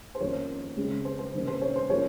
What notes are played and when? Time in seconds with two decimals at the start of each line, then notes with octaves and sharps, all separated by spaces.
0.15 C5
0.20 F2 D#3 A#3 C#4 C#5
0.76 C#3 G#3 C4
1.05 C5
1.19 C5
1.34 C3 D#3 A#3 C#4
1.48 C5
1.62 C#5
1.76 C5
1.90 F3 A#3 C#4 C#5